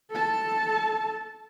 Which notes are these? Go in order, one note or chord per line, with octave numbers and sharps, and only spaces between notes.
A4 A5